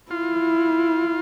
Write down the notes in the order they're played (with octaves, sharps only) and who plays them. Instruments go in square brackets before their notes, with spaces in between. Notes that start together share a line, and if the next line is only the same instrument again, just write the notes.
[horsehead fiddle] E4 [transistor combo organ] F4